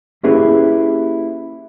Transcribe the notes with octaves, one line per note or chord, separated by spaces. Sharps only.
A#3 C#4 E4 G4 G#4 B4